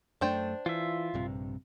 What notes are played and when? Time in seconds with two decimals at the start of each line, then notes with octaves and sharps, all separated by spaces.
0.21 F#2 A3 D4 C5 G5
0.66 E3 F4 E5
1.14 A#1 G2 C3